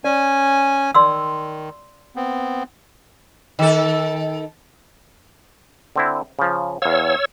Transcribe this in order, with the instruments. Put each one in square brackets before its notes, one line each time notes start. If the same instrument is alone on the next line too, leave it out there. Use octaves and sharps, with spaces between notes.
[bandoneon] C#4 G#5 [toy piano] D5
[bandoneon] D#3 [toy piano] D5 C6 E6
[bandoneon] B3 C4
[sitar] D#3 A4
[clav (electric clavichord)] D3 C4 E4
C#3 F3
[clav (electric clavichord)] E2 F5 [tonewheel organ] C#5 E6